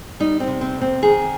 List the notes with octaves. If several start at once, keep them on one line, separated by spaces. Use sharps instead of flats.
G3 D#4
C4
C3
C4
F2
C4
D#3 G#4